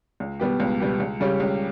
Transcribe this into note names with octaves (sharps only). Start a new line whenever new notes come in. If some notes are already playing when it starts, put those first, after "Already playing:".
C#2
B2 G3 B3 G4
C#2
B2 G3 B3 G4
C#2
C#3 G3 C#4 G4
C#2